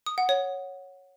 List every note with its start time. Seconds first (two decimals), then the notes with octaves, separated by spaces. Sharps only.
0.06 D#6
0.18 F#5
0.29 C#5